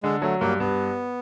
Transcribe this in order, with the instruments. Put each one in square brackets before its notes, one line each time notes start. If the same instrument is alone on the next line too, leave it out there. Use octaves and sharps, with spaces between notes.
[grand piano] D3 [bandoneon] G#3
[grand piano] F#3 [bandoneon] A3
[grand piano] G2 [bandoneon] A#3
[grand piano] G2 [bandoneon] B3